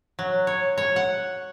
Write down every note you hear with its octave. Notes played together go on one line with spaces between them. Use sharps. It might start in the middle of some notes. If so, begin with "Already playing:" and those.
F#3
C#5
C#5
F#5